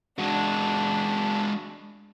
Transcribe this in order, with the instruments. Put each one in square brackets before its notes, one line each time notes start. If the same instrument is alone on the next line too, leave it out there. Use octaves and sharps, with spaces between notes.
[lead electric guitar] G#3 F#4 [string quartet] D4